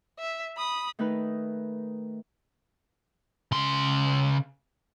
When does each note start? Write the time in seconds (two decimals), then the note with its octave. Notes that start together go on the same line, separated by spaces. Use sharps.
0.19 E5
0.57 B5 D#6
0.99 D#3 A3 D#4 B4
3.52 C#3 C6